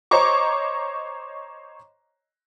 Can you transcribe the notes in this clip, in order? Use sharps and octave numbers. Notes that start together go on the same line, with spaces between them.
C5 C#5 D#5 A#5 C#6 D6